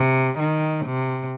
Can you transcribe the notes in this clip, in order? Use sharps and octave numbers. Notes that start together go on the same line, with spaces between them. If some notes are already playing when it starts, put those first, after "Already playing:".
Already playing: C3
D#3
C3